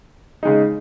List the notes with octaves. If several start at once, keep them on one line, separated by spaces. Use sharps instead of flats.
C#3 G#3 D#4